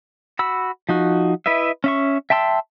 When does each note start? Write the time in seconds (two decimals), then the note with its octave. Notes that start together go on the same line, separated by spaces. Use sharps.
0.39 F#4 B5 E6
0.89 F3 D#4 F#4
1.46 E4 B4 D#5 E5
1.84 C#4 E5 C#6
2.30 E5 G5 A5 C6 E6